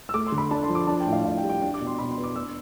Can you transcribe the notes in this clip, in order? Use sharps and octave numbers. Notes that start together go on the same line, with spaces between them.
E6
A3 D6
C6
D3
B5
D4 A5
C6
F3
D6
D4 A5
G5
A2
F5
A2 F5
G5
G3
G5
D4 G5
D6
B2
C6
B2 B5
C6
B3
D6
D4 E6